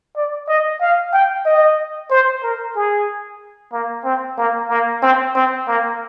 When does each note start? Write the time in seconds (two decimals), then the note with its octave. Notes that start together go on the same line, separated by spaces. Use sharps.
0.16 D5
0.49 D#5
0.81 F5
1.13 G5
1.46 D#5
2.11 C5
2.43 A#4
2.76 G#4
3.73 A#3
4.05 C4
4.38 A#3
4.69 A#3
5.02 C4
5.35 C4
5.68 A#3